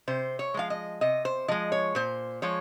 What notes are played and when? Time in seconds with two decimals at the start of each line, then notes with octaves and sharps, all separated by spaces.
0.07 C3 C5
0.39 C#5
0.54 F3 G#3 F5
0.70 D#5
1.01 C3 D#5
1.25 C5
1.48 F3 G#3 D#5
1.72 C#5
1.95 A#2 C5
2.42 F3 G#3 C#5